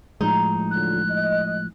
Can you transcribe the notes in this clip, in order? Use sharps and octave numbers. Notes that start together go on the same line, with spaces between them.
A2 F3 G#3 D#4
D3 F#3 F4 F#6
D#5